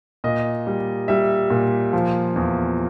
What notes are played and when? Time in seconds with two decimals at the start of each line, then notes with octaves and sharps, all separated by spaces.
0.24 A#2 D#5
0.67 G3
1.08 G3 E5
1.50 A#2
1.93 F3
2.36 E2